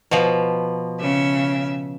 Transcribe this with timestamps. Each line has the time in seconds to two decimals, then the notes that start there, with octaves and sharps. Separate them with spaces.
0.11 B2 F3
1.00 C#3 E5